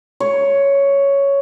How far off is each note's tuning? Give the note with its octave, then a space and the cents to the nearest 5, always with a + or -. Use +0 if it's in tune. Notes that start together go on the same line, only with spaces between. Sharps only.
C#5 +5